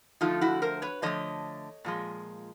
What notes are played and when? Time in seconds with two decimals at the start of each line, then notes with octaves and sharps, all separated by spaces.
0.21 D3 F3 A3 D#4 F4
0.41 E4 F#4
0.62 A#4 C5
0.82 B4 C#5
1.02 D3 F3 A3 C#5 D#5
1.85 A#2 F3 G#3